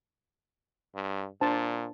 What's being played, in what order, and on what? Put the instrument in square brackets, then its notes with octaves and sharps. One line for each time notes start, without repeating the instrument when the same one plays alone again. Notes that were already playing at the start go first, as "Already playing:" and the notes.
[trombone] G2
[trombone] A#2 [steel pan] D4 C5 A5